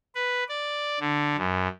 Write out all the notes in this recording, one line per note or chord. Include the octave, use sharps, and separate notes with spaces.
B4
D5
D3
F#2